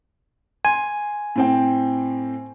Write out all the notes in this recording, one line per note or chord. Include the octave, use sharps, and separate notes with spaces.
G#5 C6
A2 C4 G5